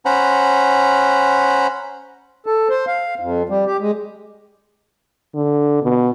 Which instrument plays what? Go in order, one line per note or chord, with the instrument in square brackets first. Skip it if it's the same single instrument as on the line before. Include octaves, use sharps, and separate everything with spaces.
[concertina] C#4 C5 F#5 A#5 B5
[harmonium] A4
C5
F5
F2
G3
G4
G#3
[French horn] D3
B2